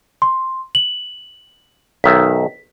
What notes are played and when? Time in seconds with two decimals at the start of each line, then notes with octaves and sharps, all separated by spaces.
0.22 C6
0.75 F#7
2.04 B1 D#3 E5 B6